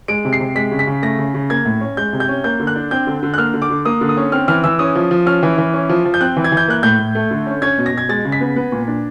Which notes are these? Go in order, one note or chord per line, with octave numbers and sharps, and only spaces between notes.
G#3 D7
C3
C7
C3
G#3 B6
C#3
B6
C#3
A3 A#6
C#3
C#3
A#3 G#6
A2
C#4
G#3 G6
C3
G6
C#4
A#3 G6
D3
F#6
D4
C4 G6
D3
D3
F#6
A#3 F6
D3
D6
D3
A#3 D#6
D3
D#6
C#4
C4 F6
E3 F6
E3 E6
C#4 D#6
F3
F3
C#4 F6
E3
E3
C#4
F3
F3
G6
C4 F#6
E3
G#6
E3
G6
A#3 F#6
A2 G6
A2
A3
D3
C#4
C#4 G#6
B2
A#6
B2 G#6
G#3 A6
C#3
B6
B3
B3
A#2
D4